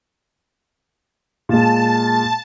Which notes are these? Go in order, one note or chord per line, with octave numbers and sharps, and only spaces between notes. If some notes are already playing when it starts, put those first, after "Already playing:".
A#2 G#3 A5